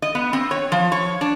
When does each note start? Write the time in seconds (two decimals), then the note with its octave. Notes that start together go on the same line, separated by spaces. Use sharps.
0.02 D#5
0.15 B3
0.33 C4
0.51 C#5
0.72 F3
0.92 C#5
1.21 D4